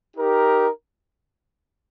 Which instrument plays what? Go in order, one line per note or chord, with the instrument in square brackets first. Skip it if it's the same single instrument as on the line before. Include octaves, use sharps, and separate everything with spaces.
[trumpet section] D#4 G4 A#4